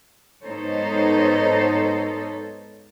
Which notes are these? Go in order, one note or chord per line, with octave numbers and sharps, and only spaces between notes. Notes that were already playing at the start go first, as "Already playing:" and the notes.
G#2 B3 D#4 A4 C5 C#5